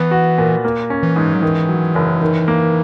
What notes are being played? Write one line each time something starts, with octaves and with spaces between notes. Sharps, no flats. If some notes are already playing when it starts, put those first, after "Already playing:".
Already playing: E3 B3
F#4
A#2
A#3
C#4
E3
G#2
F#3
D#3 E3
F#3
F#1
D#3
A#3